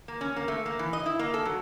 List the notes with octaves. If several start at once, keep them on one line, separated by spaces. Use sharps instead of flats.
A#3
C#4
A#3
A3
A#3
E3
D#5
E4
A#3
A4
F#3